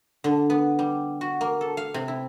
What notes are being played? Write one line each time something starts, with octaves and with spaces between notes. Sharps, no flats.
D3
B3
G3
F#4
A#3
A4
F5
C3
E4